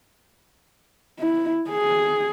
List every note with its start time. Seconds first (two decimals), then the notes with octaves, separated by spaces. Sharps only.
1.19 E4
1.70 G#4